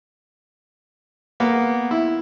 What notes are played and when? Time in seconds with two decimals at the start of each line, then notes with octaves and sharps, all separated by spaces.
1.40 A#3 B3
1.91 E4